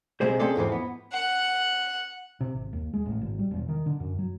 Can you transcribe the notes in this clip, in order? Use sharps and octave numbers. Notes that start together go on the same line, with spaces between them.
B1 C3 G#3 C5
C4 C#4 G#4 A4 D5
E2 G#2 E3 F3
B3
F#5
C3
G#1
D#2
G#3
A1
G#1
G3
E1
D#3
D3
F#2
F#3